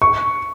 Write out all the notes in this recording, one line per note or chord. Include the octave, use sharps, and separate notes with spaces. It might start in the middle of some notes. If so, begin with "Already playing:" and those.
C#6